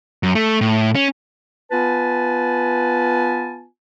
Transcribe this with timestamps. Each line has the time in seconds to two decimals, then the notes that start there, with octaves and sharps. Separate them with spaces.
0.23 F#2
0.35 A3
0.61 A2
0.95 C#4
1.72 B3 F4 B4 G#5 A5